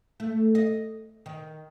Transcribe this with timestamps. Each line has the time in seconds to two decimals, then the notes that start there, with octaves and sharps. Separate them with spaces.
0.20 A3
0.55 D#5
1.26 D#3